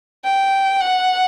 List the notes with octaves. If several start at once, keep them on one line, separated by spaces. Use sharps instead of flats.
G5
F#5